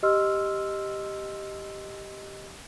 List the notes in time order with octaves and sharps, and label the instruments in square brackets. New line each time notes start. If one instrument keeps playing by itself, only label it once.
[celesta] G4 D#5 C6 E6 F6